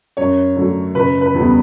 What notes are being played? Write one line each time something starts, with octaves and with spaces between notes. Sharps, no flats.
F#2 C#5
D3 F#3 A3
F#1 B4
B4
E2 D3 G3 B3